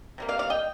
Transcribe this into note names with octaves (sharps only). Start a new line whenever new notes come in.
C3 G3 A#3
D5 F5
D5 F5
D#5 G5